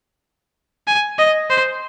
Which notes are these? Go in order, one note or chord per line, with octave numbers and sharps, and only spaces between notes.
G#5
D#5
C5